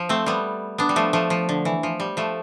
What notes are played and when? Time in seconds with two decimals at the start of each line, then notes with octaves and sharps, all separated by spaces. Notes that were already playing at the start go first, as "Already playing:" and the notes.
Already playing: F3
0.09 A3 C4
0.26 G3 B3
0.78 B3 D4
0.89 G3
0.96 F3 A3
1.13 F3 A3
1.30 F3
1.49 D3
1.65 E3
1.83 F3
2.00 G3
2.17 F3 A3